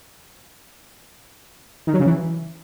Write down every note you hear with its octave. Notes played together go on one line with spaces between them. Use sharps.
D#3
F#3
C#3
E3